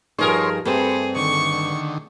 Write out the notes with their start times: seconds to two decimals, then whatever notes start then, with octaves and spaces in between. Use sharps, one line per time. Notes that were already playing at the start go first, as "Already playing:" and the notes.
0.19 G2 F3 D#4 G#4 A#4 C#5 C6
0.65 G2 A3 C4 G#4 A4 B4 C5
1.16 D3 D#3 C#6